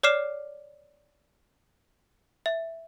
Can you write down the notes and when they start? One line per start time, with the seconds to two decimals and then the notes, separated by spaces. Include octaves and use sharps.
0.03 C#5 D5 D6 F6 C7 E7
2.46 E5